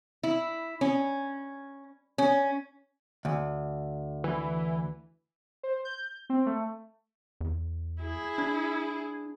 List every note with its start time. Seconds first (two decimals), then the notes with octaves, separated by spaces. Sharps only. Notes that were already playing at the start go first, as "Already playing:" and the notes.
0.23 E4
0.81 C#4
2.18 C#4
3.25 D2
4.24 E3
5.63 C5
5.85 G6
6.30 C4
6.46 A3
7.41 E2
8.02 E4 G#4
8.38 D4